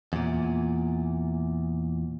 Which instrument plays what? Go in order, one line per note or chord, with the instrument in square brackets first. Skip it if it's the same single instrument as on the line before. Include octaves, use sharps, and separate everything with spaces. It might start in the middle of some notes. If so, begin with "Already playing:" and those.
[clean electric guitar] E2 A#2